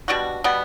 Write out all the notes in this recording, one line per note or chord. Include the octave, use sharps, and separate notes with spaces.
B2 G3 D4 F#4
B2 G3 B3